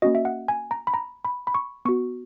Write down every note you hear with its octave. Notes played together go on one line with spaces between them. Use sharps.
A#3 C#4 F#4 D#5
E5
F#5
G#5
A#5
B5
A#5
B5
B5
C#6
B3 F#4 C#6